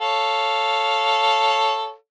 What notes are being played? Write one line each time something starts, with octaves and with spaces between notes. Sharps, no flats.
A4 C#5 F5